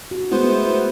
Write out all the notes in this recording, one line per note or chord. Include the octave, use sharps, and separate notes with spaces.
F#4
G#3 A3 B3 E4 C5